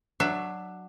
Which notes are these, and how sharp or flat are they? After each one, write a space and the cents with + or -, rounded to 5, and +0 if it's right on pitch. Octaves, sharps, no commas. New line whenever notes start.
F#3 +0 D4 +15 E5 +20